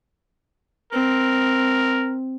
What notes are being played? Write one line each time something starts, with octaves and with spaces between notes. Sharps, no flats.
C4 A#4